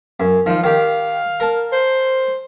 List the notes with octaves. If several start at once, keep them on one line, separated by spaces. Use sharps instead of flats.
F#2
D#3 F3 F4
D#3 G4 F5
A#4 A5
C5